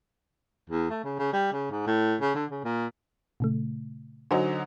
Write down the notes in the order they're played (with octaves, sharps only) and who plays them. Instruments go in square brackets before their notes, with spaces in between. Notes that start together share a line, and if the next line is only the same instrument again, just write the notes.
[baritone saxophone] E2
A3
C#3
C#3
G3
C#3
G#2
A2
C#3
D3
C#3
A#2
[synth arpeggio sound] A#2 C#3 A3
[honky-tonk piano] D3 F#3 D#4 [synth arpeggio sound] C5 G#5